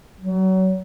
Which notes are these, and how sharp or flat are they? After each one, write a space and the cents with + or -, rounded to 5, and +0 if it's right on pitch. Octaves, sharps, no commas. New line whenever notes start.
F#3 +30